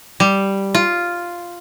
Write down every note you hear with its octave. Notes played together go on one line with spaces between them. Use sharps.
G3
F4